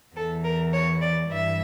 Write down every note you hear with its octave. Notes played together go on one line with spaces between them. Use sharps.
E2 E3 A4
A#4
C#5
D5
G2 E3 E5